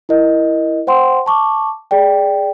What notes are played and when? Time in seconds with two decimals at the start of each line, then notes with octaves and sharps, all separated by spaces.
0.09 E4 A#4 D#5
0.87 C5 F#5 G5 C6
1.26 A5 C#6 D6
1.91 G#4 D5 G5